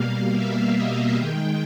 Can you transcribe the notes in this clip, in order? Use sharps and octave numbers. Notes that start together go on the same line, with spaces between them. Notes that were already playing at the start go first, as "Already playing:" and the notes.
Already playing: B2 G3 A#3 F5
E5
D#5
D#3 G#3 G5